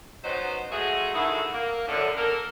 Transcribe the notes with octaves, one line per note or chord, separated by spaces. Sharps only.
F#3 B3 C#4 D#4 C5
F#3 G#3 A3 F#4 G#4
D3 D#3 E4 F#4 G#4 A4
A#3
F#2 A2 D3
D3 A#3 A4 A#4